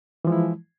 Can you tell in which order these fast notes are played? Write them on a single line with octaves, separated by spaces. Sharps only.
E3 F3 G#3 E4